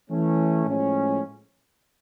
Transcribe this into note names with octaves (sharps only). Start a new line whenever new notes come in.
E3 A3 C#4
A2 F3 G#3 C#4